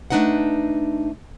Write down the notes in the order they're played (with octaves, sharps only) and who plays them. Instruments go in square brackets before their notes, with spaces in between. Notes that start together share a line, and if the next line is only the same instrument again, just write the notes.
[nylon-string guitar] A3 A#3 D4 D#4 B4 F#5